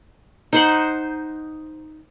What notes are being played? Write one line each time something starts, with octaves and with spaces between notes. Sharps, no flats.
D#4 C5 F#5